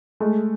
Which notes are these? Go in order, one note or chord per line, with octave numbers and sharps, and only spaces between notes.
G#3 A3